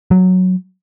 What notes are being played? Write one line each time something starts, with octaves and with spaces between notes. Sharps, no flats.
F#3